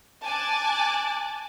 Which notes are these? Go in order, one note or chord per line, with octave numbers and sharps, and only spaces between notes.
G#5 A5 D6 F#6 A6